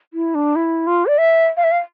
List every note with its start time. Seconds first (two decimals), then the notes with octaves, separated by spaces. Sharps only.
0.14 E4
0.35 D4
0.56 E4
0.87 F4
1.06 D5
1.18 E5
1.57 F5
1.64 E5
1.72 F5